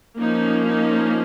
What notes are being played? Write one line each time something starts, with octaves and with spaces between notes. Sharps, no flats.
F3 A#3 C#4 D#4
D#4